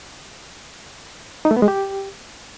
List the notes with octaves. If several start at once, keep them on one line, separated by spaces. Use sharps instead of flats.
D#4
A3
B3
G#3
G4